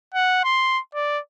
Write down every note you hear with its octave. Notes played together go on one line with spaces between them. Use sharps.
F#5
C6
D5